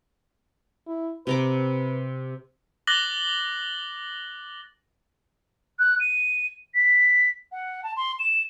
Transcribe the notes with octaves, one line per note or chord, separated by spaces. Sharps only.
E4
C3 B4 A#5 D6
D6 F#6 A6 A#6 F#7 G7
F#6
D#7
B6
F#5
A5
C6
E7